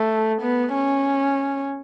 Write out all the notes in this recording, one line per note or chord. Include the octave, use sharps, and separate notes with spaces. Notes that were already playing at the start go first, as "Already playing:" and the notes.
Already playing: A3
B3
C#4